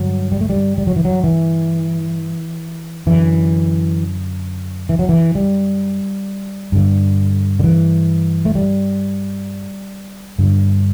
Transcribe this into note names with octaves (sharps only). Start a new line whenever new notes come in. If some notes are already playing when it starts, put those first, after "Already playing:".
Already playing: G2 D3 F#3
G3
A3
G3
G3
F#3
E3
F#3
E3
F#2 D3 E3
E3
F#3
E3
G3
G2 D3
D3
E3
A3
G3
G2 D3